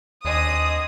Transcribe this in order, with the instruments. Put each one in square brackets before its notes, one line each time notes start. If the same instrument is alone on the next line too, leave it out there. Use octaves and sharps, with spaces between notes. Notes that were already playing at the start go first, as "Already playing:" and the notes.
[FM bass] D#2 [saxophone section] D3 C4 G#4 [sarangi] D#5 [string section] D#6